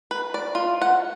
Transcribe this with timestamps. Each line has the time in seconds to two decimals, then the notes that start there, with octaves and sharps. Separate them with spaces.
0.11 B4
0.34 D5
0.55 F4
0.81 F#5